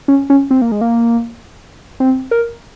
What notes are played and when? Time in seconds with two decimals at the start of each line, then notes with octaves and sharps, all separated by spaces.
0.08 C#4
0.30 C#4
0.51 C4
0.62 A#3
0.72 G#3
0.81 A#3
2.00 C4
2.31 A#4